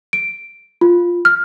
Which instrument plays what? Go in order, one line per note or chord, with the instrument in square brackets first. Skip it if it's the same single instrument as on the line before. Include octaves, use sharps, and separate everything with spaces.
[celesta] D7
F4
F6